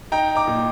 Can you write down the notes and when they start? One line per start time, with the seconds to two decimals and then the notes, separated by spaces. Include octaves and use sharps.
0.12 D#4 G5 A#5
0.35 A#5 D6
0.47 A#2